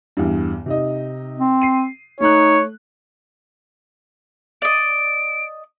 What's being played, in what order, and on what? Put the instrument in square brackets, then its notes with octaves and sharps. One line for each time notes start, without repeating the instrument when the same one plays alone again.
[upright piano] E2 G2
C3 D#4 D#5
[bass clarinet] C4
[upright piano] C7 D#7
[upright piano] A3 F#6 [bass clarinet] D#4 [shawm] C#5
[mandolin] D5 D#5 [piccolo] D7